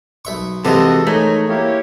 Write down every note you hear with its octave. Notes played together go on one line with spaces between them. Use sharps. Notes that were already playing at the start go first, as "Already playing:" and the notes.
B1 E5 C#6
C3 E3 F3 G#3 F#4 A4 D#5
A3 D#4 A#4 C#5 G#5
A#3 E4 G4 C#5